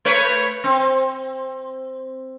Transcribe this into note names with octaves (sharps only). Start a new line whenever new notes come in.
A3 B4 C#5
C4